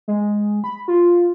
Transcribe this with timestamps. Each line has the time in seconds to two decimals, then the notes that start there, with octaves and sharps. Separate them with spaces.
0.08 G#3
0.64 B5
0.88 F4